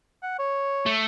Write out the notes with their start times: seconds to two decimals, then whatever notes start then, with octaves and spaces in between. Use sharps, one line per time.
0.23 F#5
0.39 C#5
0.86 A3